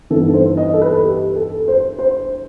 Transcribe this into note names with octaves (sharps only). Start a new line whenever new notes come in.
G2 E3 B3 D#4 A4
C5
D#5
A4
B4
G4
A4
C5
C5